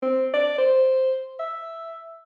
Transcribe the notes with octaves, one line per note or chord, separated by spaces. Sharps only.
C4
D5
C5
E5